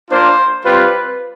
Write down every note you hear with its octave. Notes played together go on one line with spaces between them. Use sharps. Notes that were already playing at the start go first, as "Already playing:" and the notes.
A#3 D4 F4 C5
G3 C4 F4 B4